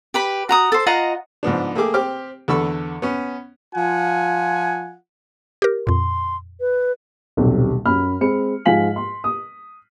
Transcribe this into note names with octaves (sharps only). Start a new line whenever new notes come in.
G4 B4 B5
F#4 A#5 D#6
A4 C5
F4 D#5 F#5 A#5
G#2 F3 B3 D4
A3 A#3 G4 G#4 D6
C4 G4 D6 F6
E2 D3 A4 B5 C#6 E6
B3 C#4
F3 F4 F#5 G#5
G4 A#4
F2 A#2 C6
B4
D#1 B1 C3
F#2 B5 F6
G#3 C4 B5 C#7
G#2 F3 F5 G#5 B6 F#7
C6
D#6